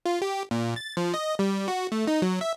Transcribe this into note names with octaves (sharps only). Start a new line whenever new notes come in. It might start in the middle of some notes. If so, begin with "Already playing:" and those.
F4
G4
A#2
A6
F3
D#5
G3
F#4
A3
D#4
F#3
E5